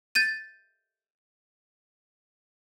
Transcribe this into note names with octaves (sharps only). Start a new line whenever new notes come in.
G6 A6 D#7